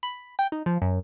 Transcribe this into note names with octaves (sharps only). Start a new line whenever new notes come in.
B5
G5
D#4
F3
F#2